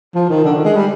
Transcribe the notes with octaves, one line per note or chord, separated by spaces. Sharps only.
F3
D#3
D3
D#3
G#3
G3